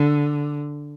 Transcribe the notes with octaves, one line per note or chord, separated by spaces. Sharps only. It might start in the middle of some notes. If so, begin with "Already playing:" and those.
Already playing: D3